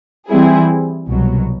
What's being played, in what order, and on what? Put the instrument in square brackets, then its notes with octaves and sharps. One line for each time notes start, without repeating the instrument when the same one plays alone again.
[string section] E3 G3 C4 E4 G#4
C2 B2 F#3